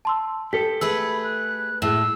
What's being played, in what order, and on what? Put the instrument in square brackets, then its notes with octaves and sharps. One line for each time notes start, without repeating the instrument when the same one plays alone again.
[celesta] A5 C6 E6
[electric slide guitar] G4 A4 [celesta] B6
[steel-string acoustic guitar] A3 G#4 B4 [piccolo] B5 [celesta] E6
[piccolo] F#6
[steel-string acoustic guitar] A2 [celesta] G#4 E7 [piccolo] E6